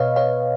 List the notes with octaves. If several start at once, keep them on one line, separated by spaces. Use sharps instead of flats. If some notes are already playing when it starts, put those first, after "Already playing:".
Already playing: B2 B4 C#5 D#5 F5
C#5 F5